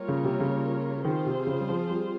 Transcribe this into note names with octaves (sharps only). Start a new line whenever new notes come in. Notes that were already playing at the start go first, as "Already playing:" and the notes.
Already playing: G3 A#3 F4 A#4 C#5
C#3
C3
C#3
D#3 C4 F4 G#4 C5
C3
C#3
G3
F3
G3